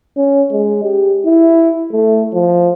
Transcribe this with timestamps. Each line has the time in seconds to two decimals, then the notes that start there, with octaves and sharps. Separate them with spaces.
0.17 C#4
0.52 G#3
0.83 G4
1.26 E4
1.92 A3
2.34 F3